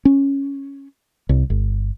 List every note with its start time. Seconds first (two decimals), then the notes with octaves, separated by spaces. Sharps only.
0.05 C#4
1.29 C2
1.50 G1